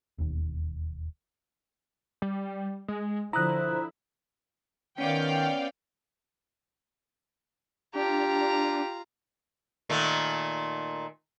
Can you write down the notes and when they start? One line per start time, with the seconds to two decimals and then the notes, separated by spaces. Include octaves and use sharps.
0.18 E1 D#2
2.22 G3
2.88 G#3
3.33 D3 F3 E4 C5 A#5 D#6 F#6
4.98 D#3 B3 C#4 D5 F5 G5
7.95 D4 F4 G4 A#5
9.90 A#2 D#3 A3